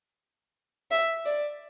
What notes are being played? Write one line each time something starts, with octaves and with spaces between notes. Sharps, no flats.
E5
D5